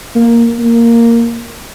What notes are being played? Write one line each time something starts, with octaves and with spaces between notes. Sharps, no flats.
A#3
A#3